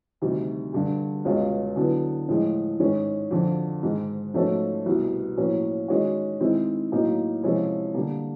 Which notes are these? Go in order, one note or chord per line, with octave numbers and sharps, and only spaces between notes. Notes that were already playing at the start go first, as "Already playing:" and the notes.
D2 C3 D#3 G3
G2 D3 G3
C#2 B2 G#3 C#4 F4
D3 F#3 B3 E4
A2 F3 G#3
G#2 D#3 G#3 C#4
F2 D3 F3
G#2 D#3 G#3
G#2 F3 A3 C#4 F#4
C2 B2 G3
A2 F3 A#3 C#4 F#4
D#3 G#3 C#4 F#4
D#3 G#3 C4 E4
A2 F#3 A#3 D#4
C3 F3 G#3 C#4 E4
D3 G3 A#3